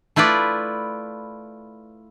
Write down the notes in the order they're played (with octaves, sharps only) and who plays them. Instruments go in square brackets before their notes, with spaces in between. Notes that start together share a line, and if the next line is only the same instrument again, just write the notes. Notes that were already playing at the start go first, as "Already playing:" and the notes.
[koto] A3 E4 F4 B4 D5